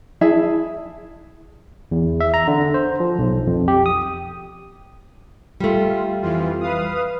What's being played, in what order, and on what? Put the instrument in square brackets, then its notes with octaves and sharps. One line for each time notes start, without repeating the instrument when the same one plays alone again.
[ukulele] E4 G#4 E5 A5
[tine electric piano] E2
E5
A#5
D3
C5
F3
B1
F2
G4
D#6
[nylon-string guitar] G3 A3 [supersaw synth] F4
[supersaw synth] F2 E3 F4
B4 F5 D#6